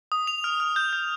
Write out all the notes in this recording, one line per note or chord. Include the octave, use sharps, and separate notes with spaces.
D#6
F7
F6
F6
G6
G6